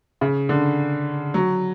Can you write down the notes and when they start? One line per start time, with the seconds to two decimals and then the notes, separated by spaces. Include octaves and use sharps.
0.21 C#3
0.49 D3
1.34 F#3